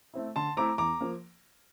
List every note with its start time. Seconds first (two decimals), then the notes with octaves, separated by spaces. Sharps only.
0.14 A3 C4 E4
0.36 D3 A5 C6
0.57 A3 C4 E4 A#5 D6
0.78 E2 A#5 D6
1.01 F3 A#3